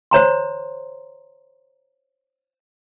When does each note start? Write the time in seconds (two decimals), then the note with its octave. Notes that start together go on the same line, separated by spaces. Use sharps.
0.11 C5 C#5 A#5 C6